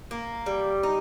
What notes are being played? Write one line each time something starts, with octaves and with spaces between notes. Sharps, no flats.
A#3
G3
D#4